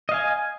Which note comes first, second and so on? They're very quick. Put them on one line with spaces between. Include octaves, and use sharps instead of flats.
D#5 F5 G#5